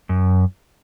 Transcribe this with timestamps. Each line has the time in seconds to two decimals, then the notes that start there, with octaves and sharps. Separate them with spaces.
0.09 F#2